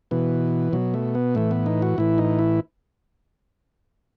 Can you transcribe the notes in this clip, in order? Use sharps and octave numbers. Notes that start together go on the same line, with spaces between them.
B2 E3
B2 F#3
A3
B3
A2 E3 A3
B3
D#4
F#4
A2 E3 E4
D#4
E4